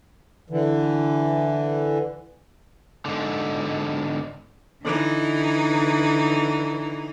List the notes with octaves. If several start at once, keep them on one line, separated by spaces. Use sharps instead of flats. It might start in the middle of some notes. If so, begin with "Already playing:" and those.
D3 E3
G#2 D3
D3 E3 D#4